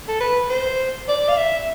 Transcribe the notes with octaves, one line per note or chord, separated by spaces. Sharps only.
A4
B4
C5
D5
F5
E5